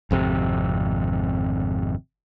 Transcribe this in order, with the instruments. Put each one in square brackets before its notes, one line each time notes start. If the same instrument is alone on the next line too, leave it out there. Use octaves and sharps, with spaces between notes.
[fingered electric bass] G#1 F2 C3